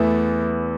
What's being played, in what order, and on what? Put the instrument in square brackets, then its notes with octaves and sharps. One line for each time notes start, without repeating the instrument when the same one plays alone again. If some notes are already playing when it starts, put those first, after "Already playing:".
Already playing: [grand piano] E2 E3 B3 E4 [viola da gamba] A3